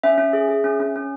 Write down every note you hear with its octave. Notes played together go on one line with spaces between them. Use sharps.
C#4 E5
C#4
G#4
G#4
C#4
C#4
C#4